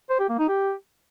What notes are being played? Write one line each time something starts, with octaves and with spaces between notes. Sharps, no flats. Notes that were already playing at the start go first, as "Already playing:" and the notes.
C5
G4
A#3
D#4
G4